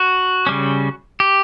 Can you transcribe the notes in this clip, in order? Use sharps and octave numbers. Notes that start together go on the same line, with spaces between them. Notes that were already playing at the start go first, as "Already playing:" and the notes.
Already playing: F#4
C#3 G3 C#4
G4